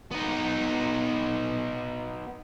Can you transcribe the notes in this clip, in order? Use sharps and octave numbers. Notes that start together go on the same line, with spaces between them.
B3 D#4